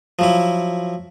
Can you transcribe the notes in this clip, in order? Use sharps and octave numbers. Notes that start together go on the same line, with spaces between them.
F3 F#3 E4